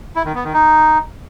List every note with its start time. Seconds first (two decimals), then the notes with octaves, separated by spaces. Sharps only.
0.16 E4
0.25 D#3
0.35 B3
0.44 D#3
0.54 D#4